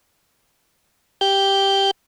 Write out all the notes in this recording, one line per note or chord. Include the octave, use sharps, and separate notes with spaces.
G4 G6